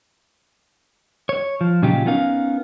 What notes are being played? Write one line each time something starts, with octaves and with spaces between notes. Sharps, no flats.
C#5
F3
A#2 C#3 F#3 D#4 F4 G4
B3 C#4 D#4 A#4 F5